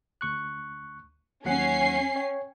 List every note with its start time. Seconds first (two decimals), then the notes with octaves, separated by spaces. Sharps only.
0.21 D2 C#6 F#6
1.45 D#2 F#3 C#4 F#5 C7
2.16 C#5 G5